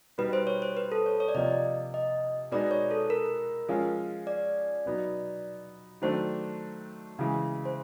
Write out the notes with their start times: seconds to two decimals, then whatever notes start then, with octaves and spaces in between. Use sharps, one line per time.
0.18 B2 G3 B3 D#4 B4
0.33 C5
0.47 C#5
0.62 C5
0.77 B4
0.92 A4
1.06 C#5
1.20 C#5
1.29 D5
1.34 C3 F3 A#3 D#5
1.94 D#5
2.52 B2 G#3 B3 D#4 D5
2.71 C#5
2.91 A4
3.10 A#4
3.69 F3 G#3 C#4 F4
4.27 D5
4.86 B2 F#3 B3 D#4
6.02 D#3 F#3 A3 D4 C5
7.19 C#3 E3 G#3
7.66 C5